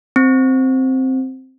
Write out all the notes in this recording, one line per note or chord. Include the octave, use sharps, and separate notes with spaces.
C4